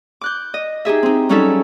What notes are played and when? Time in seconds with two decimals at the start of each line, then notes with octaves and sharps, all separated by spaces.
0.21 D6 F#6 G6
0.54 D#5
0.85 D#4 G4 G#4 E5
1.03 C4 D#4
1.29 F#3 G3 C#4 D#4 A4 E5